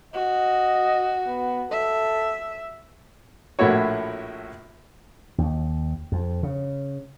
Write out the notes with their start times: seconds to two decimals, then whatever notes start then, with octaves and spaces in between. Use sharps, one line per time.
0.14 F#4 D#5
1.27 B3
1.71 A4 E5
3.59 A#1 A2 A3 E4 F#4 C#5
5.38 D#2
6.12 F2
6.43 C#3